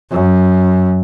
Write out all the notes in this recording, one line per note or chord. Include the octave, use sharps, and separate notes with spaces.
F#2